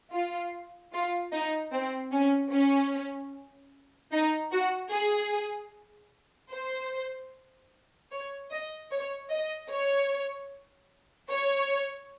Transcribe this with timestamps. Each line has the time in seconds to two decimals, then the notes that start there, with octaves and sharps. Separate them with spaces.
0.12 F4
0.93 F4
1.32 D#4
1.73 C4
2.12 C#4
2.52 C#4
4.12 D#4
4.52 F#4
4.92 G#4
6.51 C5
8.12 C#5
8.51 D#5
8.91 C#5
9.30 D#5
9.71 C#5
11.31 C#5